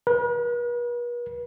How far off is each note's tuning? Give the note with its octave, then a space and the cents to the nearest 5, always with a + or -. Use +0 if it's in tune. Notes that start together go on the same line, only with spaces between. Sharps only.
B4 -45